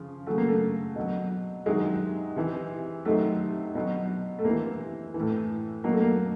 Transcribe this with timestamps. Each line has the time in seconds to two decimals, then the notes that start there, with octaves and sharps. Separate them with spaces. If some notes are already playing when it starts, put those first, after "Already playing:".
Already playing: C#3 F3
0.27 C#3 F#3 A3
0.38 A#3
0.48 A3
0.96 B2 F#3
1.66 C3 D#3 F#3 G#3
2.36 C3 E3
3.05 C3 D#3 F#3 A3
3.75 B2 F#3
4.39 A3
4.44 C3 A#3
4.50 E3
5.14 E3
5.20 A2
5.84 B2 F#3 A#3
5.93 A3
6.01 A#3